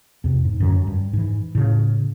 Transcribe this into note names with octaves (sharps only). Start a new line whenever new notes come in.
E2 C3
G#2
F#2 D3 E3 F#3
G2
G#2 E3
A2 C#3